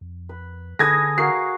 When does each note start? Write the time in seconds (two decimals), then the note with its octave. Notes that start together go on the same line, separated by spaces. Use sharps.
0.01 F2
0.29 B4
0.79 D3 G#4 A4 B4 D#6 G#6 A#6
1.18 F#4 A#4 F5 C7